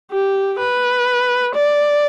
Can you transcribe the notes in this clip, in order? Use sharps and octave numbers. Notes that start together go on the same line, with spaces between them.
G4
B4
D5